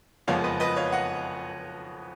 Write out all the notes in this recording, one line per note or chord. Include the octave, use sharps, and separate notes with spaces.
F#1 F2 F3 G#3 B3 C#5 F5
B4 D#5
B4 D#5
C#5 F5
D#5 F#5